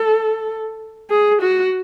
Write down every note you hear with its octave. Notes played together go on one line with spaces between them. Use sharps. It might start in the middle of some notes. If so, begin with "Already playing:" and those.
Already playing: A4
G#4
F#4